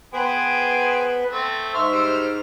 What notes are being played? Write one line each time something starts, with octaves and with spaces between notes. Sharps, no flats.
B3 G#4 B4 C5 G5
A3 C4
G#2 E5 C6 C#6 F6
G3 C5 E6